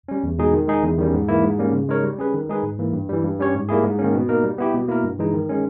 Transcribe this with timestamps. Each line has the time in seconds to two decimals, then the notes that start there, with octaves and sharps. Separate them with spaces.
0.08 G3 C#4
0.23 E2
0.38 B2 G#3 D#4 G#4
0.53 D#3
0.68 G#3 D#4 G#4
0.83 E2
0.98 D#3 G3 C#4
1.14 G#2
1.28 E3 A#3 E4
1.43 G#2
1.59 G3 A#3 C#4
1.73 C#3
1.89 G#3 D#4 A#4 C#5
2.03 G3
2.18 C#4 G#4 B4
2.34 D#3
2.49 G#3 D#4 G#4 B4
2.63 G#2
2.79 E3 A#3
2.93 G2
3.09 E3 G3
3.24 G2
3.39 G3 C#4 G4 C#5
3.54 G#2
3.69 G3 A#3 E4 G#4
3.84 G#2
3.99 D#3 A#3 C#4
4.14 B2
4.29 A#3 D#4 A#4
4.44 G3
4.58 B3 E4 G4
4.74 B2
4.88 A#3 E4 A#4
5.04 G2
5.19 E3 G#3 D#4
5.34 D#3
5.49 G#3 C#4